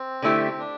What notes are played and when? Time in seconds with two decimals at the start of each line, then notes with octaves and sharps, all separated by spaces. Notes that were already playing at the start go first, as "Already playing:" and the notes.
Already playing: C4
0.22 D3 A3 E4 G4
0.58 D4